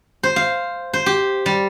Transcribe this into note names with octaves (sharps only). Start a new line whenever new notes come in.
C5
F5
C5
G4
G3